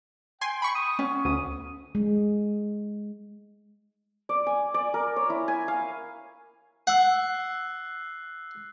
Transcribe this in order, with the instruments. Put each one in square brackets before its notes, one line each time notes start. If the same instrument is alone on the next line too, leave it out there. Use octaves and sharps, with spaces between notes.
[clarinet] G5 [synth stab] G#5 C6
[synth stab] B5 C#6
[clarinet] D#6
[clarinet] B3 [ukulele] C#4
[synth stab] D2 [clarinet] D#6
[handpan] G#3
[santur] D5
G#5
D5
A#4
C#5
E4
G#5
F5
[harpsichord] F#5 [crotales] E6 F#6 C7